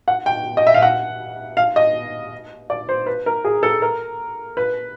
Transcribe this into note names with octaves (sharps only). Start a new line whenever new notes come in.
F#5
G5
D#5
E5
F5
F#5
F5
D#5
D5
C5
B4
A#4
G#4
A4
A#4
B4